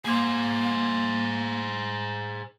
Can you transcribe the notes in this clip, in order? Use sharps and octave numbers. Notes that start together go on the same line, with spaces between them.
A#3 G#4 C5